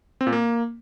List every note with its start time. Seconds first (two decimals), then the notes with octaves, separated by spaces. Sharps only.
0.21 C4
0.27 A#2
0.33 A#3